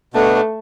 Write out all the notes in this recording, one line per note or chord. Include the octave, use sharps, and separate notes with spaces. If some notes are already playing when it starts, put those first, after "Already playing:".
B2 A3 B3 D4